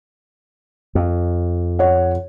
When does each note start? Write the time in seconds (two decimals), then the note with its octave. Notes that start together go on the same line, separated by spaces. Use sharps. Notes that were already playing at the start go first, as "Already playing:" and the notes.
0.95 F2
1.79 C#5 F#5